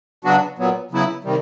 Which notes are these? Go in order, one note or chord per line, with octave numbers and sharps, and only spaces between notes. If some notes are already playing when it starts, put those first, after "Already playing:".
C#3 F#3 B3 D4 F#4
A#2 F#3 B3
C#3 F#3 B3 E4
C3 D#3 G3